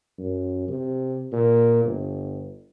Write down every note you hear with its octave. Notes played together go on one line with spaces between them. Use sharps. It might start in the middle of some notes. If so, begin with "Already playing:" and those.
F#2
C3
A#2
G1